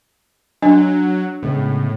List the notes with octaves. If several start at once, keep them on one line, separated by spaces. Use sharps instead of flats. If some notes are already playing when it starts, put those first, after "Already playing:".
F#3 D4 F#4 D#5
A2 C#3 G#3 B3